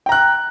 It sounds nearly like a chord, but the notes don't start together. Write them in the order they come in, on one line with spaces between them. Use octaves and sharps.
G5 A#5 F#6